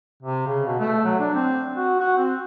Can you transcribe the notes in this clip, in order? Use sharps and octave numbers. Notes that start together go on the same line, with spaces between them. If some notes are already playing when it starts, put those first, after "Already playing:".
C3
C#3
B2
A3
F#3
D4
C4
F#4
F#4
C4